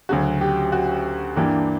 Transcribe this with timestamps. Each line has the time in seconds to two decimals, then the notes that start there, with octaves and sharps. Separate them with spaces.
0.09 D2 C#3 F#3 C#4 F#4
0.41 G4
0.72 F#4
1.36 G2 E3 A#3 D4 G4